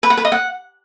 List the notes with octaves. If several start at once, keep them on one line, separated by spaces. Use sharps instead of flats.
B4
F#5
B4
D#5
F#5